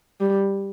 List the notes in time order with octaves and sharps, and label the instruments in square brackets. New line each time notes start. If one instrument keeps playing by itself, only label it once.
[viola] G3